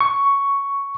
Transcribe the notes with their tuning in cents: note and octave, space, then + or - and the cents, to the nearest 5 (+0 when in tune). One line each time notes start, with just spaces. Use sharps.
C#6 +5